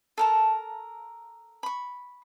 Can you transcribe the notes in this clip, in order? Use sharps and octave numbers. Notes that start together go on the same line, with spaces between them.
A4 A#4 A5
B5 C#6